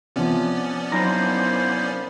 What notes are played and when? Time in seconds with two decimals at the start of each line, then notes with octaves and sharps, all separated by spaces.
0.16 C3 F3 B3 C#4 D5
0.92 F#3 A#3 D#4 E4 C5 A#5